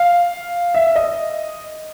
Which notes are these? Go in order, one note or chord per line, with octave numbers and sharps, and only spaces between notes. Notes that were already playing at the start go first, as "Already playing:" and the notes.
Already playing: F5
E5
D#5